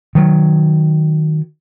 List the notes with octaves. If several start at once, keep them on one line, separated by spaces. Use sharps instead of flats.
D#3 F#3